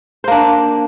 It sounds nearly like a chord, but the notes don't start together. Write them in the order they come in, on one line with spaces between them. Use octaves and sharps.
C5 A#3 D4